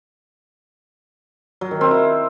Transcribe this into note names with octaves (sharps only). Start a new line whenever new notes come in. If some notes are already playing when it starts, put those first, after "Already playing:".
F#3
D#3
C4
E4